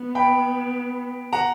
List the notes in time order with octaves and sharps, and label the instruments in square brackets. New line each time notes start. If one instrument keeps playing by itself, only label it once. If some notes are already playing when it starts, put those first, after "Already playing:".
Already playing: [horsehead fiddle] B3
[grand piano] G5 B5
F#5 A#5